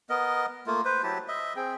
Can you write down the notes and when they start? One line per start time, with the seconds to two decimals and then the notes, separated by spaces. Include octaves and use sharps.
0.10 B3 A#4 D#5
0.67 A3 A#3 F4
0.85 B4 C5
1.03 F#3 E4 G4 A5
1.28 D#5 E5
1.56 C4 G#4 G5